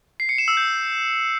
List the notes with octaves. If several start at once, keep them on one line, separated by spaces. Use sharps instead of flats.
C7
C#7
E7
E6
G6